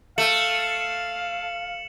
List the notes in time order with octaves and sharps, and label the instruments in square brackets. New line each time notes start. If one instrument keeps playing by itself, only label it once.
[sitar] A3 [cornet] F5 [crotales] C#7 E7 F#7